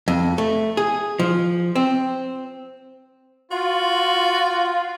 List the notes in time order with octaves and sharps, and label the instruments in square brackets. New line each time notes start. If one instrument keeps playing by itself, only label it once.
[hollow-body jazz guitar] F2
A3
G#4
F3
C4
[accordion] F4 [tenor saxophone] F#4